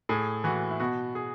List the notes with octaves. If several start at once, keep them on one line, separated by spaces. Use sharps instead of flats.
A2 G#4
E3 F#4
E4
B2 F#4
G#4